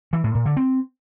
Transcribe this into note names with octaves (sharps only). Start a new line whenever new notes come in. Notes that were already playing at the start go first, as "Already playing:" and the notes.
E3
A2
A#2
D3
C4